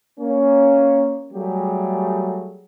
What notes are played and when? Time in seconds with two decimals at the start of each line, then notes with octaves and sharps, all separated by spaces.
0.20 A#3 C#4
1.33 F#3 G3 A3 G4 G#4